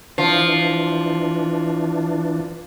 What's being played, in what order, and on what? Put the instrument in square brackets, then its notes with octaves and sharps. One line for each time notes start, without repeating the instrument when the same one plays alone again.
[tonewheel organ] E3 D4 [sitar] F3